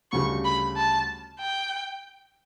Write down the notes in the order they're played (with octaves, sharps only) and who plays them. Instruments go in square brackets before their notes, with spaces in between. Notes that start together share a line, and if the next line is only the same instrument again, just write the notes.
[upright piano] D2 C#3 G3 [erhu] C#6
[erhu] B5
A5
G5